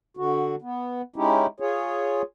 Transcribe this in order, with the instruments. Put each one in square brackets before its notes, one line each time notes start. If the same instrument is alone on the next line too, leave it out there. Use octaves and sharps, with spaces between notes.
[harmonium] D3 F#4
B3
G#3 C#4 D#4 E4 G4
F4 G#4 C#5